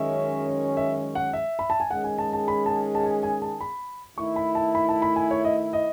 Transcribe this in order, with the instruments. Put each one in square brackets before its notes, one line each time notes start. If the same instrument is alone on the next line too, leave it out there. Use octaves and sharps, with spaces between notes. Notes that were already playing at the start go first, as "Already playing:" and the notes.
Already playing: [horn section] F#2 D#3 G#3 C#4 [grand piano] E5
[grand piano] E5
F#5
E5
B5
A5
G#5
[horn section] D#3 G#3 C#4 G#4 [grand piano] F#5
[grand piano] G#5
A5
A5
B5
A5
A5
G#5
G#5
A5
B5
[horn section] D#3 A3 E4 [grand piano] C#6
[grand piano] B5
A5
B5
A5
B5
G#5
C#5
D#5
D#5